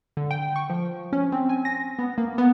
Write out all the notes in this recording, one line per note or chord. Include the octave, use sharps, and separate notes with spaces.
D3
G5
C#6
F3
C#4
C4
G#5
A#6
B3
A#3
B3